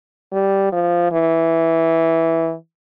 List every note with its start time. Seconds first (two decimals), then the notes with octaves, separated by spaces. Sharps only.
0.33 G3
0.72 F3
1.11 E3